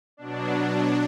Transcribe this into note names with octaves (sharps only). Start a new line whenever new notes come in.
B2 F#3 D4